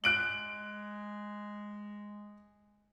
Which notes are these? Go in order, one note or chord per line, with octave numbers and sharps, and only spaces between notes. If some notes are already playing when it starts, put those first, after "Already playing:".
G#3 F#6 D7 F#7